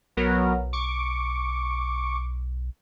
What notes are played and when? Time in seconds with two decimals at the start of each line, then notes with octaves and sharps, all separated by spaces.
0.17 B1 F#3 B3 A#4
0.73 C#6 D6